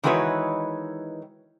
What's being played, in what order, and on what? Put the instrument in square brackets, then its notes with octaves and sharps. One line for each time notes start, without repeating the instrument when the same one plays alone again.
[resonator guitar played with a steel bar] D#3 E3 G#3 F#4 B4 C#5